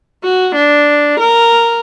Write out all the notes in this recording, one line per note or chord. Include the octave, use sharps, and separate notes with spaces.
F#4
D4
A#4